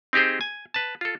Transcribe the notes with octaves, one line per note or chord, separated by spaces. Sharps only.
C4 D#4 G4 G#4 C5
G#5
B4 A5
F4 A4